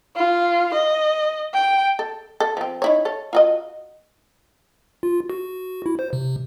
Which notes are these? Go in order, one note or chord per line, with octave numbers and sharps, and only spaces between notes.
F4
D#5
G5
A4
A4
F3 C4
D#4 E4 C#5
A4 C#5
F4 F#4 D#5
F4
F#4
E4
C5
C3